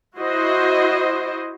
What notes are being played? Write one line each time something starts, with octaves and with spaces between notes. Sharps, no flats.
E4 F#4 C5 D#5